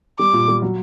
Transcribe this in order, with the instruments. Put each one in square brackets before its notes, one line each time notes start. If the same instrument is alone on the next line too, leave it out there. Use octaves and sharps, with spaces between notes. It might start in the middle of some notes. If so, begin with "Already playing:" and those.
[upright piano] G3 [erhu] D6
[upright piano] A#2
G3
F#3